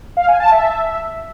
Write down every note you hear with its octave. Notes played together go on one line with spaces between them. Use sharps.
F5
G#5
A5
E5